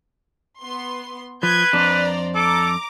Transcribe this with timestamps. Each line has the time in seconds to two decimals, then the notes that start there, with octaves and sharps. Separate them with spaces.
0.61 B3 C6
1.43 F3 B4 G6 G#6
1.73 F2 D4 C5 D5 A#5
2.35 A4 A#5 D6